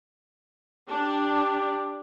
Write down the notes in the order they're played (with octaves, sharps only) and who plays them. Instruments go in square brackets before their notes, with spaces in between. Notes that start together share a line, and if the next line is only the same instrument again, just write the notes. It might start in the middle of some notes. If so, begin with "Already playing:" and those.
[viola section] D4 [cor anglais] G4